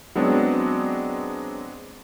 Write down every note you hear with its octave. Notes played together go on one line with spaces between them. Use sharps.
F#3 G#3 B3 C4 D4